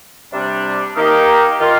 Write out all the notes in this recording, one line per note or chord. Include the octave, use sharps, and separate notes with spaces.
C3 G3 D4
D#3 A#3 D#4 G4
D#3 A#3 F4